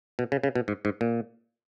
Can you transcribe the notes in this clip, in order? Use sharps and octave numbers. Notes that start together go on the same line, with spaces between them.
B2
C#3
C#3
B2
G#2
G#2
A#2